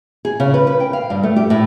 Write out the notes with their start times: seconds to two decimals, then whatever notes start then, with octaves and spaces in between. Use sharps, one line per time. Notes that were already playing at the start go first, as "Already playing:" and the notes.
0.25 G#4
0.40 C#3
0.54 B4
0.67 B4
0.80 G5
0.93 F5
1.10 G2
1.23 A3
1.36 G4
1.50 A2